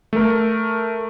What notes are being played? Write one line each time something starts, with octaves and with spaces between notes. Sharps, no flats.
A3 A#4